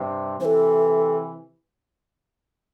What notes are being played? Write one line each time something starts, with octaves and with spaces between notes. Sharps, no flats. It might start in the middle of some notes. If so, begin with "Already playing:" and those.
Already playing: G2 C3
C3 E3 A4 C5